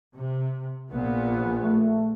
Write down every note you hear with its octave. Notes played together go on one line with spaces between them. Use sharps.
C3
A#1 A#2 B3
A3